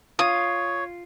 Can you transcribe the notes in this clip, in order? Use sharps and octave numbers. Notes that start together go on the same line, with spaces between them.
F4 C#5 D#6